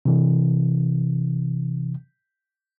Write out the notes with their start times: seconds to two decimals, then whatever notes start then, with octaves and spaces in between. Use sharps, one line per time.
0.05 C3 E3